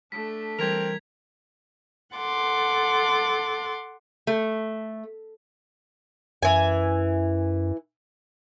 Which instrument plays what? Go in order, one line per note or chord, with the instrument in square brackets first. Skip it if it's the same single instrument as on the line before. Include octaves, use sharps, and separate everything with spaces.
[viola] A3 D4 [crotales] B6
[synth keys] E3 G3 [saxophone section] C4 A#4 [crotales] G#6 B6 F7
[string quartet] A4 F#5 C6 D6
[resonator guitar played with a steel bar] A3
[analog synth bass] F#2 [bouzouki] E3 G#5